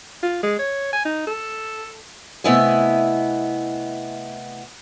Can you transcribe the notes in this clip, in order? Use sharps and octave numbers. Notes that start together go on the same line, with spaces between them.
F4
G#3
C#5
G#5
D#4
A4
C3 A3 B3 E4 D#5 G#5